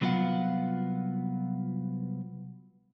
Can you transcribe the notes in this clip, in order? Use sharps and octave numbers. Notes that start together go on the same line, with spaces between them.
C2 F#3 B3 F4 F5 F#5